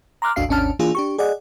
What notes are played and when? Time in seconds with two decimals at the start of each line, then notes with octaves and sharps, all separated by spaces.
0.22 A#5 C6 D6 F6 F#6
0.36 A1 D#2 D4 F#4 F5 C7
0.49 G#1 D#2 C#4 D4 A5 F6
0.79 E3 A#3 D4 F4 G#4
0.95 D4 G4 C#6
1.18 G#4 D5 D#5 F#5